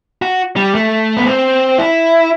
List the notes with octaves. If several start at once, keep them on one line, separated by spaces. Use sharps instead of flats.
F#4
G3
A3
B3
C4
E4